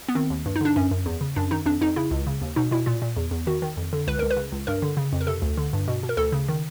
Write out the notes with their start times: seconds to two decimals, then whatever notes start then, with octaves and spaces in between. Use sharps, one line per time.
0.08 B3
0.15 D#3 C4
0.30 D#2
0.46 G2
0.56 D#4
0.61 D3 D4
0.76 F#2 C#4
0.91 F#2
1.06 E2
1.21 C#3
1.36 F#2 D4
1.51 D#3 D#4
1.66 F2 D4
1.81 F2 D#4
1.96 C#3 E4
2.11 C#2
2.27 C#3
2.42 D#2
2.56 B2 D#4
2.71 B2 E4
2.86 A#2 F4
3.02 A#2
3.17 E2
3.31 E2
3.47 D#3 F#4
3.62 D#3
3.77 F2
3.93 D3
4.07 C#2 B4
4.19 C#2 A#4
4.30 B4
4.37 C#3
4.52 C#2
4.67 G2 A#4
4.82 D3
4.97 C#3
5.13 F2
5.21 A#4
5.27 C3 A4
5.42 D2
5.57 D3
5.73 G2
5.88 B2
6.03 B2
6.09 A#4
6.17 D2 A4
6.32 C#3
6.48 D#3